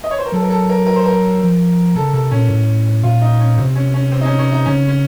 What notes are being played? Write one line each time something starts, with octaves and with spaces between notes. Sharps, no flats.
D#5
C#5
C5
A#4
F#3 A4
A#4
A4
A#4
A#4
C5
A#4
F3
C#3 A4
C3 A4
A#2 C#4
A2
A#2 F4
D#4
C#4
C3 C4
C#4
C#4
C4
D#4
C#4
C#4
D#4
C#3 C#4
C#4